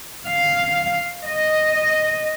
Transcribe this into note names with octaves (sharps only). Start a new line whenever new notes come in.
F5
D#5